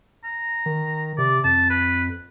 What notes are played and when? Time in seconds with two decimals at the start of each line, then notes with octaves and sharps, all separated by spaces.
0.24 A#5
0.66 D#3
1.18 C3 D5
1.44 F2 A5
1.70 B4